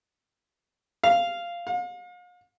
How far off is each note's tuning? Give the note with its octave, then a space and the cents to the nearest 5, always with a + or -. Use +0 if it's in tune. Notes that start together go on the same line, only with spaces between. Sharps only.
F5 -10
F5 +40